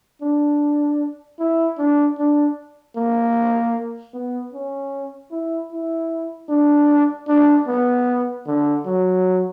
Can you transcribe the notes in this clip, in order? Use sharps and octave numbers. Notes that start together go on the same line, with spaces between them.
D4
E4
D4
D4
A#3
B3
C#4
E4
E4
D4
D4
B3
D3
F#3